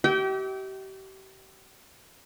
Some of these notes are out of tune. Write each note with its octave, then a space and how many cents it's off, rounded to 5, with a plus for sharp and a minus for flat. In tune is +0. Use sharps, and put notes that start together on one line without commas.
G4 -35 E5 -45 G5 -25